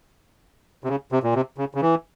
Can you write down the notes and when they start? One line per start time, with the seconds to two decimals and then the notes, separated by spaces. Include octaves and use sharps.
0.84 C3
0.89 C#3
1.12 C3
1.23 A#2
1.34 C3
1.58 C#3
1.75 C#3
1.81 E3